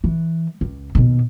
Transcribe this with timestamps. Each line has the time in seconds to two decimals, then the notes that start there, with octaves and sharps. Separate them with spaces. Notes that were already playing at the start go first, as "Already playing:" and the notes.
0.04 E3
0.61 C#2
0.95 D#2 B2